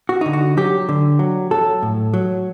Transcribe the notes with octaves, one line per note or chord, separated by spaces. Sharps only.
F#4
D3 D#4
F#4
F#3 G4
D3
F#3
F#3 A4
A2
F#3